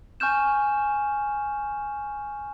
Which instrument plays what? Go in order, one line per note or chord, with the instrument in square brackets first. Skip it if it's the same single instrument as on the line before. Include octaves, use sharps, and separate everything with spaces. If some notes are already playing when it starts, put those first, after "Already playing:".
[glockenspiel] G#5 C#6 F6 G6 E7